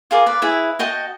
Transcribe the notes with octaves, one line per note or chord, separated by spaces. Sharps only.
F4 G#4 A#4 D5
B4 D5
E4 G#4 B4 E5
F#4 D#5 G5 A5